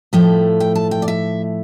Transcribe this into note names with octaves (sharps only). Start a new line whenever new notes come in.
A2 F3 A3 G5
G5
A5
G5
D5
E5